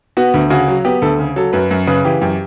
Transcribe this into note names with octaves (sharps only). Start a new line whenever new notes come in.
B3 F#4
D2
C#3 F#4
F#3
B3 G4
D2 A4
C#3
F#3 A4
F#2 B4
F#2
C#3 B4
E3 G4
F#2 G4